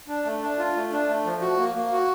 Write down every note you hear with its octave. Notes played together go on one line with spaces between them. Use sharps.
D4
A3
D4
F4
A3
D4
A3
F3
F#4
A#3
A#3
F#4